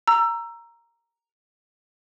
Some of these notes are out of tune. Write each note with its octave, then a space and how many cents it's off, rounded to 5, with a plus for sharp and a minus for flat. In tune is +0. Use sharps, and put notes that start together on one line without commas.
A#5 +0 E6 +20